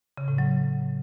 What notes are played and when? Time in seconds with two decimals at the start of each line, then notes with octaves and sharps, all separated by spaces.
0.17 C#3
0.28 A2
0.38 F#3